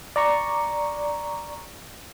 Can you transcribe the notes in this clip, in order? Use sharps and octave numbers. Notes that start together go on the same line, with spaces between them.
D5 A#5 C#6